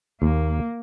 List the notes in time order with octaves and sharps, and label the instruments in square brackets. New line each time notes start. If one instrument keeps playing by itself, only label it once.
[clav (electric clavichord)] D#2 [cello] A#3